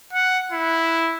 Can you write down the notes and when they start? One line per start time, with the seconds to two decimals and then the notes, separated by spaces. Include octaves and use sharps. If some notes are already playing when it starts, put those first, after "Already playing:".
0.13 F#5
0.52 E4